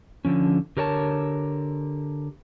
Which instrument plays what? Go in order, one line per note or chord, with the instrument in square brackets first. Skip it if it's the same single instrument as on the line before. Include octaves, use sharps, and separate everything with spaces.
[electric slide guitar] D3 F3 C#4
D3 G4 A#4 C#5 G#5 A5